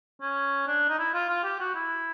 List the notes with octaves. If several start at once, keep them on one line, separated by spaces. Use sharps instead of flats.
C#4
D4
D#4
E4
F4
F4
G4
F#4
E4